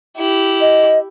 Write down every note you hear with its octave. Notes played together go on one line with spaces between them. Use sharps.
E4 G4
D#5